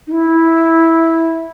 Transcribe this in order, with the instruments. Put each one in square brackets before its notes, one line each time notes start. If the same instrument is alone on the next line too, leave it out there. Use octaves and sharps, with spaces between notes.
[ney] D#4
E4